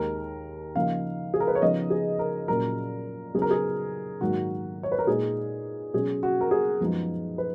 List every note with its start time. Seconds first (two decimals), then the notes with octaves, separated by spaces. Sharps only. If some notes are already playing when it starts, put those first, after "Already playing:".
Already playing: D#2 D#3 G#3 A#4
0.76 C#3 F3 A#3 D#4 F5
1.34 G#4
1.40 A#4
1.47 B4
1.55 C#5
1.62 C#3 F3 B3 D#4 D#5
1.90 G#4
2.19 A#4
2.48 A#2 F#3 C#4 A#4
3.34 C#3 F#3 B3 D#4 G#4
3.42 A#4
3.51 G#4
4.21 G#2 D#3 F#3 A#3 F#4
4.83 C#5
4.92 B4
4.99 A#4
5.07 A#2 G#3 D#4 G#4
5.94 B2 F#3 C#4 G#4
6.23 F#4
6.41 A#4
6.51 G#4
6.80 F#2 F3 G#3 B3 D#4
7.38 B4